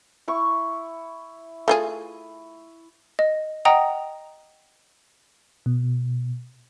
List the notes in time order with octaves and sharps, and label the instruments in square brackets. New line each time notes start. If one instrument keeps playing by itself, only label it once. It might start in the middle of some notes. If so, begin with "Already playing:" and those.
[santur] E4 C#6
[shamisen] A3 F4 G#4
[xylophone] D#5
D#5 F#5 G5 A#5 D#6
[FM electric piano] B2